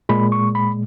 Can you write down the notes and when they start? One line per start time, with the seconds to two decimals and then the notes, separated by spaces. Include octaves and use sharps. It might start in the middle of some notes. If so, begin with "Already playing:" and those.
0.09 A#2 G#3 B5
0.32 C#6
0.55 B5